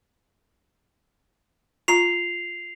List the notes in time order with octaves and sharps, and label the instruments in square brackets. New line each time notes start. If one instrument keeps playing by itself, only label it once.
[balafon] F4 A#5 [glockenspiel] C7 F7